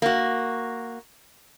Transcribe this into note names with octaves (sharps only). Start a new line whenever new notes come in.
A#3 F#4